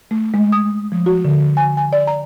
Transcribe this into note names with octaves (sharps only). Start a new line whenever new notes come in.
A3
G#3
D#6
F3
F#4
D3
G#5
G#5
D5
A#5